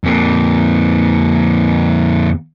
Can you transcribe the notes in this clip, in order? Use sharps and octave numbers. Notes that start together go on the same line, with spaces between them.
F2 A#3